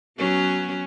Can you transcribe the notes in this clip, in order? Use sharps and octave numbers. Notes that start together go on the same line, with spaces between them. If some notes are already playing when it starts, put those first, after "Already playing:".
F#3 B3 C#4